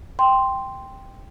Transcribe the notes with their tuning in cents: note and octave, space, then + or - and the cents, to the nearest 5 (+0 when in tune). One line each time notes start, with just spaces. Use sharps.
G5 +0 C6 +0